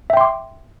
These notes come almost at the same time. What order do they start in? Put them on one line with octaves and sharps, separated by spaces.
E5 G5 C6 D6